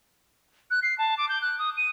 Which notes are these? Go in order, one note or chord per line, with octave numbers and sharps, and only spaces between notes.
F#6
C7
A5
D6
G6
F#6
D#6
D#7